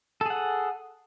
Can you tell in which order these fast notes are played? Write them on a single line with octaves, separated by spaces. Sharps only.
A4 G#4 F#5